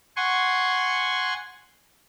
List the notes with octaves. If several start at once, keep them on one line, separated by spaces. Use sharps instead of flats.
F#5 G#5 C6 C#6